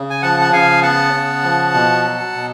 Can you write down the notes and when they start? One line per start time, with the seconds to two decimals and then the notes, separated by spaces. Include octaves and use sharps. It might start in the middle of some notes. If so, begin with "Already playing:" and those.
Already playing: C#3
0.10 G#5
0.22 F3 F#5 A5
0.40 F#5
0.53 C#3 F5 G#5
0.82 B3 F#5 A5
1.13 C#3
1.43 F3
1.74 B2
2.04 F#3
2.34 B2